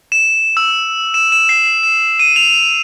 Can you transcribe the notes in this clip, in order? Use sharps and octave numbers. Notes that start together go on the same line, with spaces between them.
E7
E6
E7
E7
C7
E7
D#7
F7